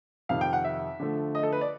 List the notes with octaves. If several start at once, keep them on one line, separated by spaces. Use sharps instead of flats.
F2 C3 D#3 F5
G5
F#5
E5
D3 F3 A3
D#5
A4
B4
D5